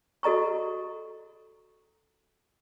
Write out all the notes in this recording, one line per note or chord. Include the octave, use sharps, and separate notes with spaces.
F#4 A4 D#5 A#5 C#6